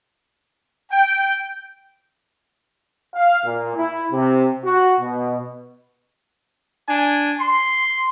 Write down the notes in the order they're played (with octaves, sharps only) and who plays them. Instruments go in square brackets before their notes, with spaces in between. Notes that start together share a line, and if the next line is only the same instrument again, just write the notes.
[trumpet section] G5
[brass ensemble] F5
A#2
E4
C3
F#4
B2
[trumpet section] D4 G#5
C6